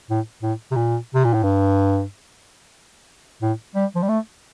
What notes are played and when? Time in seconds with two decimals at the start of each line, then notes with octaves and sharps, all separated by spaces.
0.10 A2
0.43 A2
0.71 C3
0.76 A#2
1.15 C3
1.25 A#2
1.34 A2
1.43 G2
3.42 A2
3.75 G3
3.96 F3
4.03 G3
4.09 A3